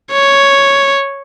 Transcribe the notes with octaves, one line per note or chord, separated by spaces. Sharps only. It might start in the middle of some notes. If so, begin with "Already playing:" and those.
C#5